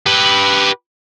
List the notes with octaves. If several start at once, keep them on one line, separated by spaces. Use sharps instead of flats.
G4 B4